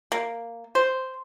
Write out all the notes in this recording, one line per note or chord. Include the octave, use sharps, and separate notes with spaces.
A#3
C5